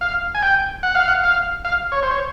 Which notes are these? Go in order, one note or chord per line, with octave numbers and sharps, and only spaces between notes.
F5
G#5
G5
F#5
F5
F#5
F5
F5
C#5
C5
C#5